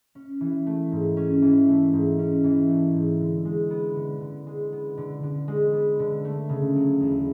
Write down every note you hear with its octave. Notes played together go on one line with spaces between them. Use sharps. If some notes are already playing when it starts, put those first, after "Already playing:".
C#4
E3
A3
G#2
C#4
E3
A3
G#2
C#4
E3
A3
G#2
D3
G#3
B3
D3
D3
G#3
B3
D3
D3
G#3
B3
D3
A3
C#3
F#3
E2